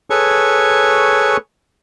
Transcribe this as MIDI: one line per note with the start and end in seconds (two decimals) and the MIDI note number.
0.10 1.37 68
0.10 1.37 69
0.10 1.37 71
0.10 1.37 73
0.10 1.37 85